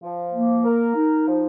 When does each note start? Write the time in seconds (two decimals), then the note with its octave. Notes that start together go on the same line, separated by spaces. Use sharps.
0.02 F3
0.33 A#3
0.64 A#4
0.96 D#4
1.27 F3